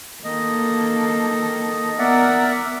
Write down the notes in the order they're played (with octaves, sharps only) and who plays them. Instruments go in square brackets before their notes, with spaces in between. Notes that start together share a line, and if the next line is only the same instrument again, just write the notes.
[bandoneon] D#3 D#5 [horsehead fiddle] A#3 A4
[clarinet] B3 [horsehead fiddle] A#4 [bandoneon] D5 E5 F#5